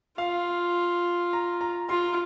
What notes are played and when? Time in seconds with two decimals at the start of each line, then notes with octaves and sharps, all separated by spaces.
0.18 F4 F5
1.33 A#5
1.61 A#5
1.89 F4 C6